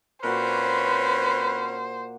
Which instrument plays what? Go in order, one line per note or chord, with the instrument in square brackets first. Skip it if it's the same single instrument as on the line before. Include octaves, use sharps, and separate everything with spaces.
[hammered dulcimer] A#2 A#3 F#4 [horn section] C4 C#4 [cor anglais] B4 [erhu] C5